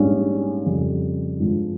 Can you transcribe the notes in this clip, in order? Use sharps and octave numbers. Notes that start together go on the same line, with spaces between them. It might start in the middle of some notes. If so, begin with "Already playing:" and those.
Already playing: A#1 G#2 G3 C#4
F2 C#3 G3
G#1 G2 F3 G#3